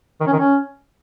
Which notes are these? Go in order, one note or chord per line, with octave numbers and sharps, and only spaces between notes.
D#3
C#4
D#3
C#4